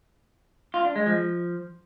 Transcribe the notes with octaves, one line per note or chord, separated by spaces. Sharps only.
F4
D4
G#3
F3